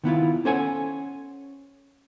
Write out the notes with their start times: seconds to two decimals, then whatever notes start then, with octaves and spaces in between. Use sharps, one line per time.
0.04 D#3 B3 E4 F4
0.45 C#4 A4 C5 C#5 F#5 G#5